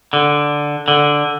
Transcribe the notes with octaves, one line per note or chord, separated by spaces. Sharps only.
D3
D3